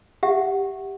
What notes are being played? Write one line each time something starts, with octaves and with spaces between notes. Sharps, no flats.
G4 E5 F#5